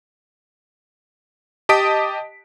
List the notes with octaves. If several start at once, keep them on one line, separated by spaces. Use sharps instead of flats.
G4 D#5 A5 D#6 B6 D7